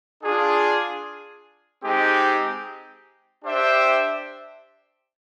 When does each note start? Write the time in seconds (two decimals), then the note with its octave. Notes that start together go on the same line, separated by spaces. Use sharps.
0.23 D4 F4 G#4
1.83 G#3 C4 D#4 G4
3.44 D4 G4 C5 E5 G5